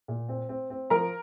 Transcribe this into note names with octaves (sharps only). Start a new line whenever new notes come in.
A#2
C4
C4
C4
F3 A#4 A#5